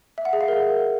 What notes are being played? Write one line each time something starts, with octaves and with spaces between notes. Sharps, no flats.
E5
F#5
G#4
F5
A#4